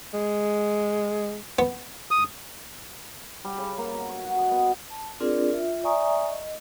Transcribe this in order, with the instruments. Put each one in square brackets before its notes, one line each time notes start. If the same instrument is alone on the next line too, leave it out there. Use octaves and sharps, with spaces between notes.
[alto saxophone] G#3
[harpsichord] B3
[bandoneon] D#6
[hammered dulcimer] G3
C#3
A#3
B2
C#5
F#4
D#5
B3
[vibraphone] A5
C4 D4 F4 G#4 A#4 D5
F4 E5
D5 E5 G#5 A#5 C#6 D#6
D#5